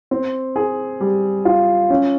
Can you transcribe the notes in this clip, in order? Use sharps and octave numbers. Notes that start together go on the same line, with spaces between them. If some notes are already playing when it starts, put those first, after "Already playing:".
C4
G#4
G3
F4
C#4